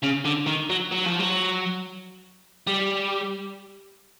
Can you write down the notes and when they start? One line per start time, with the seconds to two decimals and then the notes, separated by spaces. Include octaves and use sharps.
0.03 C#3
0.25 D3
0.47 D#3
0.70 F#3
0.91 F#3
1.06 F3
1.19 F#3
2.67 G3